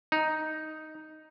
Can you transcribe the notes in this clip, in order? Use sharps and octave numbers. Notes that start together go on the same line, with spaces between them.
D#4